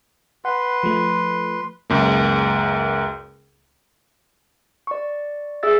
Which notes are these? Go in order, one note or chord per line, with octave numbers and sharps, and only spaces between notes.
B4 F#5 C6
F3 A3
C#2 F#2 A#3
D5 C#6
G#4 E5 E6 A6